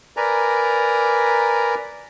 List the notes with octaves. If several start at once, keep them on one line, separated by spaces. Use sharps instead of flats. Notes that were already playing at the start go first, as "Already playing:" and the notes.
A#4 B4 D5 G#5 A#5